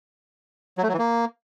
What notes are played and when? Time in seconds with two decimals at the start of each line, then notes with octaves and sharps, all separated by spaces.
0.78 F#3
0.83 A3
0.88 F#3
0.93 E3
0.99 A#3